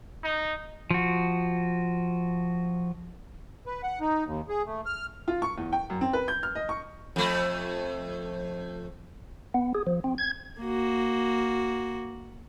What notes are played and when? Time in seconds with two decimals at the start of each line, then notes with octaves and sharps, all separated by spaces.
0.24 D#4
0.90 F3 F#4
3.66 B4
3.83 F#5
4.01 D#4
4.26 D#2
4.49 G#4
4.66 A3
4.86 F6
5.28 F4
5.42 C#6
5.58 E2
5.73 G5
5.90 F#2
6.01 C4
6.13 B4
6.28 G6
6.43 F6
6.55 D#5
6.69 C#6
7.16 F2 A3
9.54 B3
9.75 G#4
9.87 F3
10.04 C4
10.18 G#6
10.61 A#3 F#4